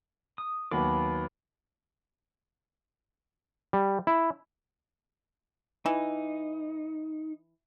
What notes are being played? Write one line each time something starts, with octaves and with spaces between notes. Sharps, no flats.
D#6
D#2 F#3 B3 B5 D6
G3
E4
E3 D#4